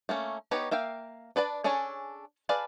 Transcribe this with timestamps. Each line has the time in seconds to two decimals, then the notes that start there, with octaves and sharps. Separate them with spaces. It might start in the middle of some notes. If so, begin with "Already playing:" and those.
0.09 A3 A#3 C#4
0.51 B3 D#4 G4 B4 C#5
0.71 A#3 E5 F5 G5
1.36 D4 B4 D5 A5
1.64 C#4 D4 G#4 A4 C#5
2.49 G#4 B4 D5 F5 A5